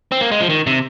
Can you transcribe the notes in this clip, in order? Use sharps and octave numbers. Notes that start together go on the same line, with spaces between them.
C4
A#3
G#3
F3
D#3
C3